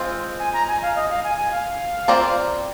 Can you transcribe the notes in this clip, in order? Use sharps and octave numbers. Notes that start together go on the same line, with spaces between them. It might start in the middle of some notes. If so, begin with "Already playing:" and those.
Already playing: G#3 C4 F4
G#5
A#5
G#5
F5
D#5
F5
G#5
G#5
F5
C4 F4 A#4 D5